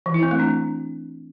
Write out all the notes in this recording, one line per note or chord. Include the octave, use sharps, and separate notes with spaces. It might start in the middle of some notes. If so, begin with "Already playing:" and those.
E3
E4
C4
A3
D4